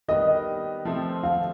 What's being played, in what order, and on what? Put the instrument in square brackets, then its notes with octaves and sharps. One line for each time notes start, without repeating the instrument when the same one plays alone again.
[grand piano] D#3 G3 B3 [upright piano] D#5
[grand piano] F3 A3 C4
[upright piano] F5